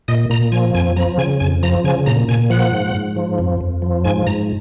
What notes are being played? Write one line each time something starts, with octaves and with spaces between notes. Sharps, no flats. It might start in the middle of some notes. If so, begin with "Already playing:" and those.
A#2 D#5
A#2 A#5
F3 G#5
F2 G#5
F3 A#5
C#3 G#5
F2 G#5
F3 A#5
C#3 G#5
A#2 A#5
A#2 G#5
F3 F#5
G#2
G#2
F3
F2
F2
F3
G#2 G#5
G#2 A#5